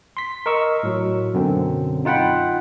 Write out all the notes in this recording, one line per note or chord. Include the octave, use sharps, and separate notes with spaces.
C6 B6
A#4 D#5 C#6 E6
A2 F#3
F#2 B2 D3 C4
D#4 F4 F#5 G5 B5